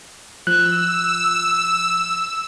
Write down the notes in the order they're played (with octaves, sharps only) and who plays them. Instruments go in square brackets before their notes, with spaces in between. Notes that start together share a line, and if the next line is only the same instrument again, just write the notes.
[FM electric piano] F3 [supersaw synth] E6 [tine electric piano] F#6